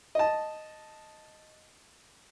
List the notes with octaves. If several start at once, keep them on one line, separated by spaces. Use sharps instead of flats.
D#5 A5